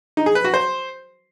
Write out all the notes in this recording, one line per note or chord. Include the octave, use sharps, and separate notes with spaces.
D#4
G#4
B4
F#4
C5